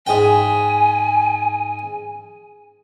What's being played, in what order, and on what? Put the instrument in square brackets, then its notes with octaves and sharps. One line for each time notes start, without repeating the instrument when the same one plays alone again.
[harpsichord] G#2 G5 [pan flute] G#5